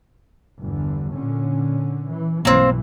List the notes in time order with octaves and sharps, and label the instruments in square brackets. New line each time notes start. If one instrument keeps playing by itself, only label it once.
[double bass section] G1 E2 D3
A#2 D3 C#4
E3
[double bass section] B1 G2 E3 [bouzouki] A#3 C4